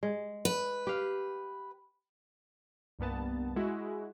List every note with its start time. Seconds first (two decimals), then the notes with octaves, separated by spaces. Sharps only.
0.03 G#3
0.45 B4
0.87 G4 F5
2.99 C2 G2 A#3 B3 A5
3.56 G#3 E4 F#4